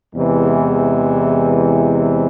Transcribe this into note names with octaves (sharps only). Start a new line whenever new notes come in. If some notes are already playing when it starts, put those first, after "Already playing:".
E2 C3 E3 G#3